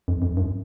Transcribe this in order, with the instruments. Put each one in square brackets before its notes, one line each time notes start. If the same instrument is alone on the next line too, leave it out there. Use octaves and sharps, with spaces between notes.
[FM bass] F2
F2
F#2